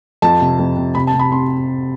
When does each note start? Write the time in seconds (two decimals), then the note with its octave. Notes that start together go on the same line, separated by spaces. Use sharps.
0.22 F2 A5
0.41 C3
0.59 F2
0.77 C3
0.95 C3 B5
1.07 A5
1.13 C3
1.19 B5
1.32 C4 C6